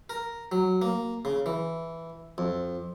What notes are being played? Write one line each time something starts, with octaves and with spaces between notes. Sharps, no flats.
A#4
F#3
A#3
C#3
E3
F2